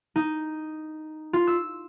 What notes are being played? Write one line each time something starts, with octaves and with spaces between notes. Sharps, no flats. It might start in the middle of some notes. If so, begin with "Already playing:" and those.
D#4
F4
E6